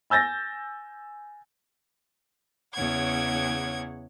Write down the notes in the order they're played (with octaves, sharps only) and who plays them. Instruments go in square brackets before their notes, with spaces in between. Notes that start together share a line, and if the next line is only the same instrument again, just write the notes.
[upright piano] G#5 E6 G6 A6 A#6
[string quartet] E2 C#3 C#5 F#5 G#6